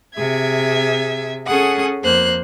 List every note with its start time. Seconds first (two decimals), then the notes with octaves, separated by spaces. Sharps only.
0.14 C3 G#4 E5 G#6
1.46 C#4 G#4 A4 F#5 D#6
2.01 F2 A#3 C5 F#6